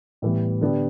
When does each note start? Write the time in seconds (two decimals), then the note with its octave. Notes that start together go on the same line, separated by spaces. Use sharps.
0.22 A2 E3 G3 B3
0.61 D3 B3 D4 G4